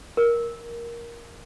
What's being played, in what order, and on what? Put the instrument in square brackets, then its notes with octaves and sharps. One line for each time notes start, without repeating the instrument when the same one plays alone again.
[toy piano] A#4